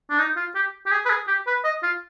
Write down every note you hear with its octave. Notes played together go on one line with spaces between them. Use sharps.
D4
D#4
F4
G4
G4
G#4
B4
G#4
G4
B4
D#5
F4